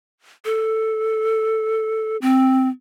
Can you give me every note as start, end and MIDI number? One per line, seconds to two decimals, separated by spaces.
0.45 2.17 69
2.22 2.69 60